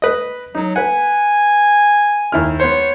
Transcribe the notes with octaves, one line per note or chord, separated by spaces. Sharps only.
B4 D#5
F#3 D#4
B4 F#5 G#5
D#2 E4 F6
B3 C5 C#5